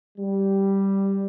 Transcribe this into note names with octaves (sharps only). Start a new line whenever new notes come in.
G3